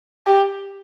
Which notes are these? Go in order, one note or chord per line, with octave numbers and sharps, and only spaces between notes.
G4